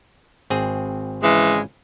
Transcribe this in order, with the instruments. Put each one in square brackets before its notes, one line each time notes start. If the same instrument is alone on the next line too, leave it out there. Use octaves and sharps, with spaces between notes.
[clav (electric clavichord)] G#1 C4 G#4
[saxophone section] C#3 E3 G#3